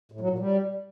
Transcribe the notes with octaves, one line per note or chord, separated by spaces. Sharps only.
A2
F#3
A#2
G3